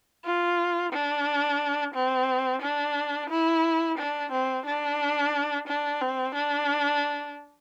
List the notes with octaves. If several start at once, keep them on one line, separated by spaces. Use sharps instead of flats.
F4
D4
C4
D4
E4
D4
C4
D4
D4
C4
D4